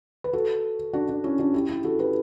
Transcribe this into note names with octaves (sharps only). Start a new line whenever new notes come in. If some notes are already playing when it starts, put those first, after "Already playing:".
B4
F#4 A4
D4 F#4
D4
C#4 E4
D4 F#4
E4 G4
E4 G4
F#4 A4
G4 B4